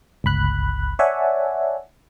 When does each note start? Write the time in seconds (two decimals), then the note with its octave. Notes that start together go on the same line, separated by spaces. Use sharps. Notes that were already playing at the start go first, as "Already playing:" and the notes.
0.24 G1 C#2 B5 F#6
0.99 C#5 D5 E5 F#5 G#5 A5